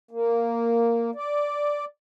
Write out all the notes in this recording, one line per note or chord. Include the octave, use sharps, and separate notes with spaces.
A#3
D5